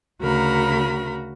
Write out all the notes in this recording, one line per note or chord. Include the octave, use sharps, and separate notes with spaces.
D2 C#3 F#4 A#4 A#5 B5